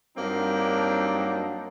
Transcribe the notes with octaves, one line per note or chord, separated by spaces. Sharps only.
G2 F#3 A#3 C4 D4 D#4